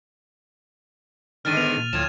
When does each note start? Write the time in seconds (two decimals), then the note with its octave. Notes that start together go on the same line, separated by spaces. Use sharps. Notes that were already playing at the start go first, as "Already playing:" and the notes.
1.45 G#2 D3 D#3 F6 A6 D#7
1.57 B3 F7
1.77 A#2
1.93 D2 A2 F3 G#6 E7